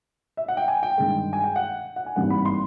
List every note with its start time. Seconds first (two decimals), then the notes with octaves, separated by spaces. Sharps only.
0.37 E5
0.48 F#5
0.57 G5
0.68 G#5
0.83 G5
0.98 G2 D#3 G#3
1.33 G#5
1.44 G5
1.56 F#5
1.96 F#5
2.06 G#5
2.16 G#1 G2 E3 G3 A#3 F#5
2.30 B5
2.45 C6